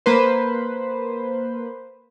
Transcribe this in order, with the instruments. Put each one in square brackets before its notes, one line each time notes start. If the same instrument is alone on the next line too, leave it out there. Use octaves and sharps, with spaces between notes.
[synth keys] A#3 B4 C5